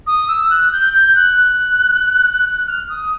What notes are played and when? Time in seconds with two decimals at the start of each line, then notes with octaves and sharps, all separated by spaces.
0.06 D#6
0.28 E6
0.50 F#6
0.72 G6
0.93 G6
1.15 F#6
1.37 F#6
2.67 F6
2.89 D#6